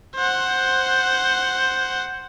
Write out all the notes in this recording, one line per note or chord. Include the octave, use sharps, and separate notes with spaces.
C5 F#5